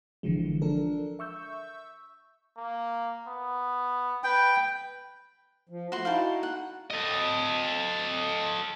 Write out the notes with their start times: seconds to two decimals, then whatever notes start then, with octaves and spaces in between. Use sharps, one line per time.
0.23 G#1 D3 E3 F3 G#3
0.62 F3 D4 A4 A#4
1.19 E5 C#6 E6 G6
2.58 A#3
3.28 B3
4.24 B4 G5
5.69 F3
5.92 A3 F#4 C6
6.05 D#4 E4 F#4 F5 G5 A5
6.43 F#5
6.91 A4 D#5